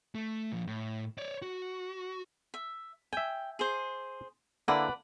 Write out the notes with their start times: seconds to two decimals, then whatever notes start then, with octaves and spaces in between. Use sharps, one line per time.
0.15 A3
0.52 A#2 F3
0.67 A2
1.18 C#5 D5
1.42 F#4
2.54 E5
3.13 E5 G5 G#5
3.59 G#4 C5
4.68 D3 A#3 E4 B4 D5 F#5